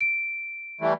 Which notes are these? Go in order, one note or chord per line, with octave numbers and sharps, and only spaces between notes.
D7
E3 G3 A3